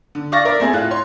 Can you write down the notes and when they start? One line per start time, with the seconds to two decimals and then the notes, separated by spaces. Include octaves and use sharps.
0.15 D3
0.32 D5 F5 C#6 A6 A#6
0.45 A#4 D5 E5
0.60 A3 C4 G#4
0.73 A2 F4 F#6
0.91 C#5 C6